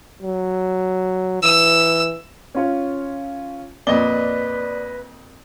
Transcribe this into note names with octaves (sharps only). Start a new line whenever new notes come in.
F#3
E3 E6
C#4 F4 C#5
F2 A#2 B4 D5 D#5 G7